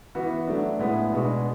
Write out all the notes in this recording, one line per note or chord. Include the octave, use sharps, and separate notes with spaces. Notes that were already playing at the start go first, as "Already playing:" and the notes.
E3 B3 F#4
F#3 A3 D4
A2 G#3 B3
B2 G#3 B3 D4 F#4